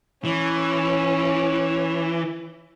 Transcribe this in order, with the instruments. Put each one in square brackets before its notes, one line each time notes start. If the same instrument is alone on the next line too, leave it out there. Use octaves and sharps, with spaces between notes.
[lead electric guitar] E3 [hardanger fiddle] C#4